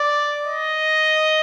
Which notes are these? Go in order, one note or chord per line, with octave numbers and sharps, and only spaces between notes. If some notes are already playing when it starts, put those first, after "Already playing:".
Already playing: D5
D#5